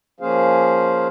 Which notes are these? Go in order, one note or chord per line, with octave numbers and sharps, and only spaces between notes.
F3 A#3 C#4 G#4 C5 F5